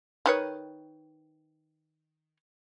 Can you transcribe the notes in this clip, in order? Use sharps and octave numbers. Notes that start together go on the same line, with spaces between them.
D#3 B4 C#5